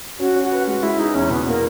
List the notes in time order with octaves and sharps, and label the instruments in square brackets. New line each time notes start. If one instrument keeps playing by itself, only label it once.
[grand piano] C#4 [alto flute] F#4
[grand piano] C#4
[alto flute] F#4
[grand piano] B4
[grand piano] G#3 [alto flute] F#4
[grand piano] G#3 [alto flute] E4
[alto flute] D#4 [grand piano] G#4
[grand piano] E2 [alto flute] C#4
[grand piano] B2 [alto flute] B3
[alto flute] A#3